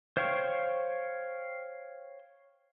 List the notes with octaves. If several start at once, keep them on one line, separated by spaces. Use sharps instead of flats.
C5 C#5 F5 G5 C#6